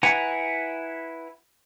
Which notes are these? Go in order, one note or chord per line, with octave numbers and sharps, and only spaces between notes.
E4 B4 F#5 G#5 A#5